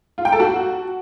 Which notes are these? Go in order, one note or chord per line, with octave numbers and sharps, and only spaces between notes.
F4
G5
A4
F#4